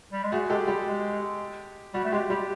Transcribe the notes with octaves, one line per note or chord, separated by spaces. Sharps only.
G3
G#3
A3 F#4 G#4
G#3 G4 A4
G3 G4
G#3
G3 F#4
A3
G#3 G4
G3 G4